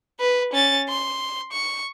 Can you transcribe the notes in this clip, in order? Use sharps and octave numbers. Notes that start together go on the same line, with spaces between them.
B4
C#4 A6
C6
C#6